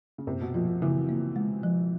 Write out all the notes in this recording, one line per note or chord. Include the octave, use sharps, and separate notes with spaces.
C#3
F#2 C3
B2
A#2 F3
A#2
C#3 E3
A#3
G#3
F3